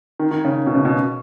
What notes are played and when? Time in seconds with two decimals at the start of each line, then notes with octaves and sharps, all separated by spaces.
0.19 D#3
0.31 D#3
0.45 C#3
0.66 B2
0.75 C#3
0.85 B2